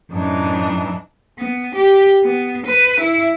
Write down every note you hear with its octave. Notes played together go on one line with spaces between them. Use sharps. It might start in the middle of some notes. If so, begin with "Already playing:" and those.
F#2 A2 E3 D4 D#4
B3
G4
B3
B4
E4